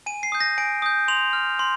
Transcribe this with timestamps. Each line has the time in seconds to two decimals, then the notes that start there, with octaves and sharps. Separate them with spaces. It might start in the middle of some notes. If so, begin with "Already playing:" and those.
0.06 G#5 D#7
0.23 C7
0.32 D#6 G6
0.41 A#6
0.58 G#5 D7
0.82 D#6 G6
1.08 C6 F7
1.33 F6
1.59 C6